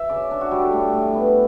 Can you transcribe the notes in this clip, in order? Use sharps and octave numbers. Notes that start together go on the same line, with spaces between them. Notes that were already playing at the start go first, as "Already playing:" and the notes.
Already playing: E5
C#3 D5
D4
F#4
G3 G4
A4
A2
A2
B3